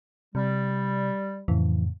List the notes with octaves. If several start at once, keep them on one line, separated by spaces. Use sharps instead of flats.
C3 G3
F2 A2 C#3 E3